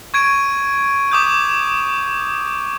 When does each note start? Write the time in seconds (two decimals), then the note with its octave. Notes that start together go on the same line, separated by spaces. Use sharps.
0.14 C#6 G#6 D7 D#7
1.11 D6 D#6 G6